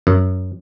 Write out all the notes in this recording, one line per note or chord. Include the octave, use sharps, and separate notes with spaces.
F#2